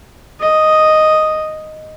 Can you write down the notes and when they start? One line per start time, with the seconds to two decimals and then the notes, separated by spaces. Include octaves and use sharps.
0.40 D#5